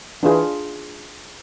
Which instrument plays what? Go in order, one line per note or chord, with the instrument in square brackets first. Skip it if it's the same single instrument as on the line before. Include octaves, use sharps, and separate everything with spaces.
[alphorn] E3 [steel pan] D4 F4 G#4